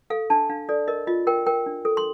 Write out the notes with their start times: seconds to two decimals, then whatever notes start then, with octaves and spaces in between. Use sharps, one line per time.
0.10 A4 F5
0.30 D4 A5
0.49 D4 F5
0.69 A4 D5
0.88 A#4 D#5
1.07 F4 D#5
1.27 A#4 G5
1.46 A#4 G5
1.66 D4
1.85 A4
1.97 C6